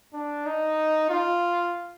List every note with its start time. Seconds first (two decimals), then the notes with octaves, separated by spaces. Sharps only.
0.13 D4
0.46 D#4
1.10 F4